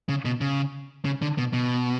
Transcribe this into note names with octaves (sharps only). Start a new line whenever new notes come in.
C#3
B2
C#3
C#3
D3
B2
B2